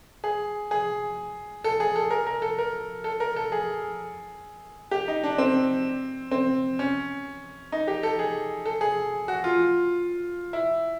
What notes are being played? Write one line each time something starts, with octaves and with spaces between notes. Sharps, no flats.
G#4
G#4
A4
G#4
A4
A#4
A#4
A4
A#4
A4
A#4
A4
G#4
G4
D#4
D4
C4
C4
C#4
D#4
G4
A4
G#4
A4
G#4
F#4
F4
E4